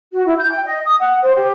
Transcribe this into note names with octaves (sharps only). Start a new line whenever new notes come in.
F#4
E4
G6
G5
D#5
D#6
F#5
C5
G4